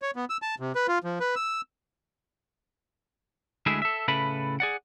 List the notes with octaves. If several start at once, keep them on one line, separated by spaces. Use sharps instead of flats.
C#5
B3
E6
A5
C3
B4
F4
F3
B4
E6
D2 G#3 A3 E4 G#4 E5
A4 E5
A2 C#3 E4 A4 B4 B5
G#4 D5 F#5